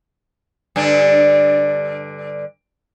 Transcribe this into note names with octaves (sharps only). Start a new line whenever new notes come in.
G2 D3 D4